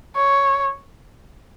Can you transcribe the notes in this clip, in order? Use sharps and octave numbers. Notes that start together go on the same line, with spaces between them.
C#5